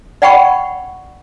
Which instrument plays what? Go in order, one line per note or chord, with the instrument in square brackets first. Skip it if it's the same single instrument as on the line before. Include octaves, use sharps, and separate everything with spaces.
[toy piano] D5 F#5 G5 B5 C#6